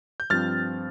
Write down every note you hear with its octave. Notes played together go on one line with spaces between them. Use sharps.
G6
G2 F3 C4 F6 A6